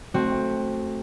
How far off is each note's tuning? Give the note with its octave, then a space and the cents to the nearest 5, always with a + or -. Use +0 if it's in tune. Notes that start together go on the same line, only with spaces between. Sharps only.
A3 -5 C4 +15 F#4 +0